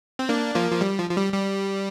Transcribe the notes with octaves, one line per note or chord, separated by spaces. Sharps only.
C4
A#3 D4
F3 A#3
F3
G3
F3
F3
G3
G3